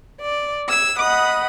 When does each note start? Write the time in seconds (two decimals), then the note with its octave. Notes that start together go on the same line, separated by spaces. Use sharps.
0.22 D5
0.70 E6 G#6
0.98 D#5 F#5 B5 D#6